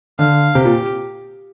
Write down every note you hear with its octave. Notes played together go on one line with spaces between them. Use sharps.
D3 F5
C3 G4
A#2